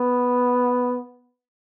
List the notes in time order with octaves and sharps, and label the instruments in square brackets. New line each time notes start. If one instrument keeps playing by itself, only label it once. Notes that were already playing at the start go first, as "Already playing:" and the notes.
Already playing: [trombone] B3